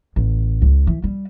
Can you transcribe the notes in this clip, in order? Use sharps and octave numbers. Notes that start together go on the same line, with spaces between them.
A1
C#2
E3
G3